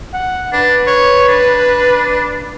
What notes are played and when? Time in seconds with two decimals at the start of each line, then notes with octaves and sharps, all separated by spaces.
0.14 F#5
0.53 D4 B4
0.87 C#5
1.28 D4